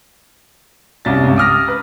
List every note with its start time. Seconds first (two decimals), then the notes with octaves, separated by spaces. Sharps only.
1.05 C2 F#2 A6
1.23 C#2 G2
1.36 D6 D#6 F6 A#6
1.68 B4